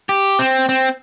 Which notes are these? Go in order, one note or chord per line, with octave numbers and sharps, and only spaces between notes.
G4
C4
C4